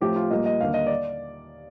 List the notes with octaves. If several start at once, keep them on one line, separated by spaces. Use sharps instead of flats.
A2 F3 A3 C4 G4
F4
A#2 G3 A#3 D#5
D#5
D#2 D3 G3 A#3 F5
D#5
D5